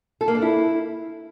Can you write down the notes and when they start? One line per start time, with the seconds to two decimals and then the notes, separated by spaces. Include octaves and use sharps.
0.21 A4
0.28 A#3
0.35 D4
0.42 E4